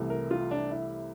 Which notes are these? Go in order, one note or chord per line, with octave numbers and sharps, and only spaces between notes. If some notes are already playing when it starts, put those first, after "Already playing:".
Already playing: C2 C3 E3 A3
A#4
F4
D4
E4